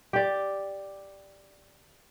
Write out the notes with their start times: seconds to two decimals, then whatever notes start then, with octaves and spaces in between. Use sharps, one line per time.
0.13 G4 D5